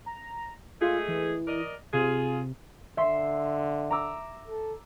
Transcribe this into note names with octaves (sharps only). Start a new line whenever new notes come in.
A#5
G#3 A3 F4 G#4
E3
A#4 D5 D#5
C3 F4 G#4
D3 E5 C6 C7
A#5 D6 E6
A4